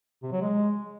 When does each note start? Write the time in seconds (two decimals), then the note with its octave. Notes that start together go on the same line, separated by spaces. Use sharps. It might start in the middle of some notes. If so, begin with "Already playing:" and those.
0.23 C3
0.32 F#3
0.42 G#3